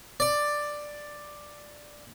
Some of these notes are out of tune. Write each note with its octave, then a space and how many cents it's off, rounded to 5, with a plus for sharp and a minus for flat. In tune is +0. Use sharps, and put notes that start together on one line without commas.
D5 +5